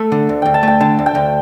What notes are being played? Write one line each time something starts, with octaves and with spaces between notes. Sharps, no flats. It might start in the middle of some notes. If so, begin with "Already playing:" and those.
Already playing: A3 A4
D3
D2
D2 G5
A5
A3 G5
D3 A5
D2
G5
D2